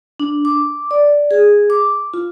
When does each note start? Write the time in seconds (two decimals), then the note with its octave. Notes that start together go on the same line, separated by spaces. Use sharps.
0.20 D4
0.45 D6
0.91 D5
1.31 G#4
1.70 D6
2.14 F4